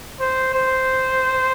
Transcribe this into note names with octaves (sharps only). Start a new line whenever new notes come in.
C5
C5